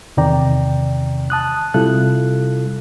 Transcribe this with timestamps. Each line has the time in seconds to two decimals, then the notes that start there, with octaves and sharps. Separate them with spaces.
0.17 E2 C3 D#3 D5 G5 A#5
1.30 A5 D#6 F#6
1.74 C3 G3 E4 F4 A4 F#6